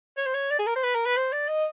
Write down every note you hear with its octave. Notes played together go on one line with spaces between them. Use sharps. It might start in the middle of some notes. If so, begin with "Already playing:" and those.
C#5
C5
C#5
D5
G#4
A#4
C5
B4
A#4
B4
C5
D5
D#5